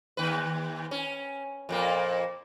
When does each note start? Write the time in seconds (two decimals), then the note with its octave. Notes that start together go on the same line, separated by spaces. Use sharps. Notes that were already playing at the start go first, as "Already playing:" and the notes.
0.17 D#2 B4
0.91 C#4
1.69 F2 A#2 A#3